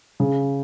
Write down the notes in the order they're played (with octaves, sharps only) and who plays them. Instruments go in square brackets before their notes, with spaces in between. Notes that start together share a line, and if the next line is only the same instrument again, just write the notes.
[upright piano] C#3